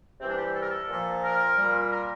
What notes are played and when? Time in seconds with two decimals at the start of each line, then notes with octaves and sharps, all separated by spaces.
0.20 C3 E3 G3 C4
0.29 D4
0.37 G4
0.55 A4
0.62 A#4
0.70 A4
0.89 A#2 F3
1.23 A#4
1.56 A#2 G3
1.91 A#4